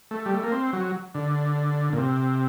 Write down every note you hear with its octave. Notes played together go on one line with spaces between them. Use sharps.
A3
G3
A3
A#3
C4
F#3
D3
A#2
C3